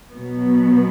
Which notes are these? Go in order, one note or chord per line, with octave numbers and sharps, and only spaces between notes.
B2 F#3 B3